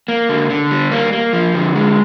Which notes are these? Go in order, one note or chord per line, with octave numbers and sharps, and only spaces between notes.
A#3
D3
D3
G3
A#3
A#3
F3
D3
G#3